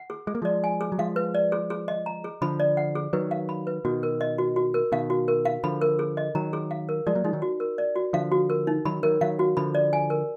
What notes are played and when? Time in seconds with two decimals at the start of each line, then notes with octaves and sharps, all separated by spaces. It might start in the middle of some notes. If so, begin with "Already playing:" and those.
Already playing: F#5
0.10 G#4
0.27 G#3 G#4
0.35 A#3
0.42 F3 G#3 D5
0.64 G#5
0.81 G#4
0.92 F#3
0.98 F3 G#3 F5
1.16 B4
1.35 D5
1.52 G#4
1.70 G#4
1.88 D#5
2.06 A#5
2.24 G#4
2.42 D3 F3 B5
2.60 D5
2.77 F#5
2.95 G#4
3.13 D#3 F#3 B4
3.31 F5
3.49 B5
3.67 B4
3.85 B2 D#3 F#4
4.03 A#4
4.21 D#5
4.38 F#4
4.56 F#4
4.74 A#4
4.92 B2 D#3 F5
5.10 F#4
5.28 A#4
5.45 F5
5.64 D3 F3 B5
5.82 A#4
5.99 G#4
6.17 D#5
6.35 D#3 F#3 A#5
6.53 G#4
6.71 F5
6.89 A#4
7.07 F3 G#3 D5
7.15 F#3 A#3
7.24 F3 G#3 D#4
7.33 D#3 F#3
7.42 F#4
7.60 A#4
7.78 D5
7.96 F#4
8.13 D3 F3 F5
8.32 F#4
8.50 A#4
8.67 D#4
8.85 D#3 F#3 B5
9.03 D#3 F#3 A#4
9.21 D#3 F#3 F5
9.39 F#4
9.57 D3 F3 B5
9.75 D5
9.93 G#5
10.10 A#4